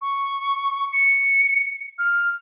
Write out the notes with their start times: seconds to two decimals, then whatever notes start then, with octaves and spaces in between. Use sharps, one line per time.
0.02 C#6
0.93 C#7
1.99 F6